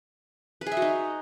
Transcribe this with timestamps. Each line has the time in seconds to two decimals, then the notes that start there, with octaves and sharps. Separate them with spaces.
0.61 B4
0.66 G#4
0.72 E5
0.77 F#4
0.82 D#4